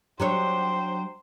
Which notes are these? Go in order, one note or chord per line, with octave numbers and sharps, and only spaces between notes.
F#3 D4 C5 C#5 G5